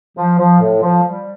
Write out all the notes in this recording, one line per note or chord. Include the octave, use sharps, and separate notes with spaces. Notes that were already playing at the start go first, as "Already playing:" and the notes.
F3
F3
A2
F3
G3